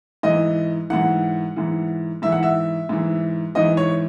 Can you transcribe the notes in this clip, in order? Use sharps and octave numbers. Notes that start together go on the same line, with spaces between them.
G#2 E3 D#5
G#2 E3 F#5
G#2 E3
G#2 E3 E5
F#5
E5
G#2 E3
G#2 E3 D#5
C#5